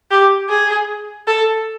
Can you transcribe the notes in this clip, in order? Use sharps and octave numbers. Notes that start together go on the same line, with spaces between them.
G4
G#4
A4